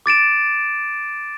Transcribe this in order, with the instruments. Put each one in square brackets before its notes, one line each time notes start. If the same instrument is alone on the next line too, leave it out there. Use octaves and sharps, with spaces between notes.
[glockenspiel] D6 A6 D7 E7